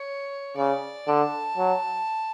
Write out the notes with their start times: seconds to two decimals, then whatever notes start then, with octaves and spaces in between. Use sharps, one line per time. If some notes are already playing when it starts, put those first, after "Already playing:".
Already playing: C#5
0.57 C#3 D5
1.07 D3 A5
1.58 F#3